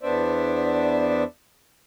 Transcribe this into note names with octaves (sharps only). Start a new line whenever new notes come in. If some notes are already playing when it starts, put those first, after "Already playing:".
E2 B3 D4 C5 D5 E5